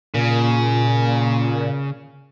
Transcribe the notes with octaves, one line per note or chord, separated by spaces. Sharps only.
A#2 C#3